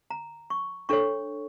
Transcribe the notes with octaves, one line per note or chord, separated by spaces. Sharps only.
A#5
C#6
D4 A4 C#5 C#6